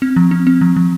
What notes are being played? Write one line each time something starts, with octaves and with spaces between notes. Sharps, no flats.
C4
F3
C4
C4
F3
F3